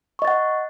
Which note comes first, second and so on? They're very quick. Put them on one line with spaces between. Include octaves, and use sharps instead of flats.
C#6 D#5 A6 F#5